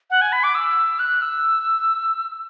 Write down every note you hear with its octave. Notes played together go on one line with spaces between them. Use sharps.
F#5
G#5
B5
D6
E6
F#6
E6